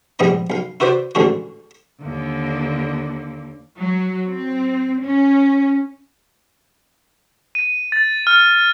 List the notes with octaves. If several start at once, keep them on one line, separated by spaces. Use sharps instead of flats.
A#1 G#2 G3 B3 D#5 A#5
B1 F5
E4 F#4 B4 C5 D5
A1 G#2 D3 D4 F#4
D#2 D3
F#3
C4
C#4
D#7
A6
F6